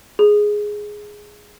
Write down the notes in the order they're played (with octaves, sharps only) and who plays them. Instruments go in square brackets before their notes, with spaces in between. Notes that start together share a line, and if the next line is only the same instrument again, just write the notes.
[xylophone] G#4